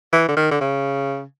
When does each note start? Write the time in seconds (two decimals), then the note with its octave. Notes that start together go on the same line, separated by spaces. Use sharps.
0.13 E3
0.29 D3
0.37 D#3
0.51 D3
0.61 C#3